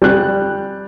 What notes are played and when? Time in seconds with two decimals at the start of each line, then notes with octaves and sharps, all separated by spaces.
0.02 G3 F#6